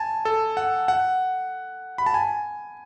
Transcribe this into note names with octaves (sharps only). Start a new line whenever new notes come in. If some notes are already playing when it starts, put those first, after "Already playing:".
Already playing: G#5 A5
A4
F#5
F#5
B5
A5
G#5